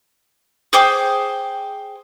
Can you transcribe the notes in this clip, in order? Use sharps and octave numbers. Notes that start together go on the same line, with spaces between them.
G#4 C5 G5 D6